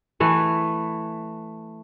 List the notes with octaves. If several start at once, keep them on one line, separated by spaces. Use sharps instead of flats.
E3 A3 B4